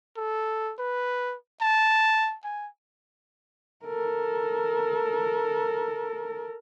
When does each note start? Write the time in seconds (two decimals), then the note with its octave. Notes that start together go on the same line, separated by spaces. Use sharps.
0.17 A4
0.79 B4
1.61 A5
2.44 G#5
3.85 A4 A#4